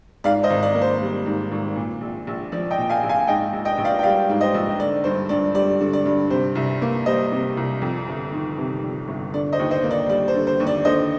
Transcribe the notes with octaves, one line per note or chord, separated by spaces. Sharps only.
G#2 D5 F5
C5 D#5
G#1
D5
A#3
C5
G3
G#2
G#1
A#2
A#1
A#1
F3 D5
D#5 G5
A#2
F5 G#5
A#1
F5 G#5
G#2 D#5 G5
A#1
D#5 G5
A#1
D5 F5
G5
G3 D5 F5
G#2
C5 D#5
A#1
D3 D5
G2 C5
G2 D5
G3 D5
D3
D5
G2
C3 C5
C2
A#3
G3 C5 D#5
C3
C2
F2
G1
D#3
C3
F2
G1
D3 D5
C5 D#5
D#2
C5 D#5
A#3
D5
G3 D5
C5
D3
C5
D#2
D5
D3 C5 D#5